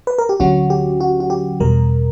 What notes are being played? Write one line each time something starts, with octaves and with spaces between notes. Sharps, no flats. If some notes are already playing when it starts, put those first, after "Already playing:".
B4
A#4
G4
D2 D3 F#3 C#4 F#4
G4
F#4
F#4
G4
E2 B2 G3 A#4